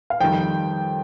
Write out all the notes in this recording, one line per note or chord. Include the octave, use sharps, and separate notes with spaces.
F5
F2 D#3 G3 G5